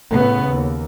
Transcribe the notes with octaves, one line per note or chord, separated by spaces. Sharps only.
A2 C#3 B3
D#2